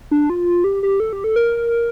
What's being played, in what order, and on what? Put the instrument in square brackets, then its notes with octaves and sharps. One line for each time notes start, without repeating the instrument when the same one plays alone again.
[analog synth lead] D4
F4
G4
G4
A4
G4
A4
A#4